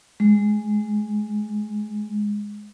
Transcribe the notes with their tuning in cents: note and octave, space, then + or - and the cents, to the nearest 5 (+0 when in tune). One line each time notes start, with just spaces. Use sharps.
G#3 -5